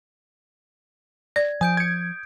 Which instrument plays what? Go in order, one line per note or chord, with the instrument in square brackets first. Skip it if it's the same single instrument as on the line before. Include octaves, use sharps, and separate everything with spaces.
[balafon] D5 [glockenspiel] G#6
[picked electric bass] F3 [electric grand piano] G#5 [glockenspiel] D#6 G6 D7
[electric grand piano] G#6 C#7